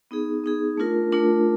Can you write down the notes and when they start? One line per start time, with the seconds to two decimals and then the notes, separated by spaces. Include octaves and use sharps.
0.11 B3 D#4 G#4
0.44 B3 D#4 G#4
0.77 A3 D4 F4 A#4
1.12 A3 D4 F4 A#4